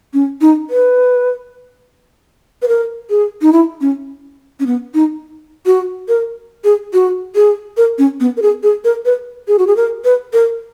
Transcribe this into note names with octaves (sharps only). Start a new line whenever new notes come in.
C#4
D#4
B4
B4
A#4
G#4
D#4
E4
C#4
C#4
B3
D#4
F#4
A#4
G#4
F#4
G#4
A#4
C#4
B3
A#4
G#4
G#4
A#4
B4
G#4
F#4
G#4
A#4
B4
A#4